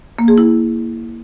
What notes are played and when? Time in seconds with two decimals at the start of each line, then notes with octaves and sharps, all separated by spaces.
0.19 A#3
0.28 G#4
0.38 E4